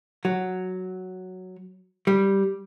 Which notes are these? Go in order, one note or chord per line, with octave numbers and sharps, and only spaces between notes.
F#3
G3